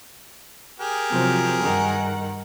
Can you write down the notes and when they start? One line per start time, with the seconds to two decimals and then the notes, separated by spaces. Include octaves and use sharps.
0.80 G4 G#4 A#4
1.10 C3 F3 F#3
1.62 G2 D#3 F#5